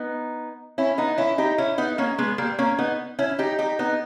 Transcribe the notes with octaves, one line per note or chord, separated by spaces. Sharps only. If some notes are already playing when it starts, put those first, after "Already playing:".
Already playing: B3 D#4
C#4 E4
B3 D#4
C#4 E4
D#4 G4
C#4 E4
B3 D#4
A#3 C#4
G#3 B3
G3 A#3
A#3 C#4
B3 D#4
C#4 E4
D#4 G4
D#4 G4
B3 D#4